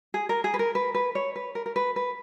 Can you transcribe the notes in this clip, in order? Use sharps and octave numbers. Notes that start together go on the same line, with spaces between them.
G#4
A#4
G#4
B4
A#4
B4
B4
C#5
B4
A#4
A#4
B4
B4